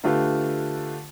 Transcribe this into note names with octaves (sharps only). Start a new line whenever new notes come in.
D3 A3 F4 G4 B4